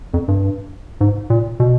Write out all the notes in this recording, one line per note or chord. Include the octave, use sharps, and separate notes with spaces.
F2
G2
G#2
A#2
B2